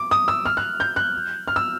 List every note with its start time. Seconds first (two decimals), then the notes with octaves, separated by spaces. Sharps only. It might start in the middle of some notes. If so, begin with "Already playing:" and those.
Already playing: D6
0.11 D#6
0.28 E6
0.46 F6
0.57 F#6
0.80 G6
0.96 F#6
1.48 F6
1.56 E6